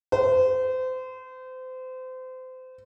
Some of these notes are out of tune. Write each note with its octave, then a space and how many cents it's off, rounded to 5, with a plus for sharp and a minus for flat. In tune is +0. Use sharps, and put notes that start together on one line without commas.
C5 -30